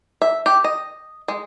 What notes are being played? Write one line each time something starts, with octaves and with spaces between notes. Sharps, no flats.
E5
G4
D#5
G#3